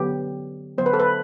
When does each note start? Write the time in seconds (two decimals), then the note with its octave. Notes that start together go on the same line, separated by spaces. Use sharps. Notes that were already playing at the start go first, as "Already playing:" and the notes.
Already playing: D3 F#3 B3 G4
0.78 D3 F#3 B3 C5
0.86 B4
0.93 A4
1.00 B4